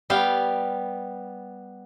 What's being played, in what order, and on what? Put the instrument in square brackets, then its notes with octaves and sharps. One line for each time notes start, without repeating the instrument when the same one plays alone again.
[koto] G3 B3 F5 G5